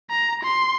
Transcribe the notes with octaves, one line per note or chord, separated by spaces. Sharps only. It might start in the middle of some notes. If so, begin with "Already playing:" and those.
A#5
C6